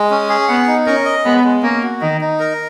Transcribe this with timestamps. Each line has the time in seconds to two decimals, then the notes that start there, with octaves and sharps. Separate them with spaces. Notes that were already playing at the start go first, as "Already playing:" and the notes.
Already playing: G#3
0.11 C#4
0.29 G#4
0.48 B3 F#5
0.67 D#4
0.86 C#4 A#4
1.05 D#5
1.25 G#3 B3
1.44 G#3
1.63 A#3 C#4
1.83 F#4
2.01 D#3 D#4
2.21 D#4
2.39 A#4